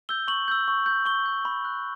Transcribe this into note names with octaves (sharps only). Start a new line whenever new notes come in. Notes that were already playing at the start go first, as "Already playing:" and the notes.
E6 G6 G7
C#6 F#7
E6 G6
C#6
G6
C#6 G7
G6
B5
F#6